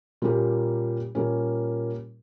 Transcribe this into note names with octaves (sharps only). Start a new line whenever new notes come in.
A#2 G3 A#3 C#4 G4
A#2 G3 A#3 C#4